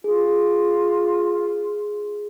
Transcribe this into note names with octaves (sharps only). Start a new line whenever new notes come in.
F4 G#4